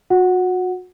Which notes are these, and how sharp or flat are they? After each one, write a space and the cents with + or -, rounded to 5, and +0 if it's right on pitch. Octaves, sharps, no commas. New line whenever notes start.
F#4 -30 F#5 +0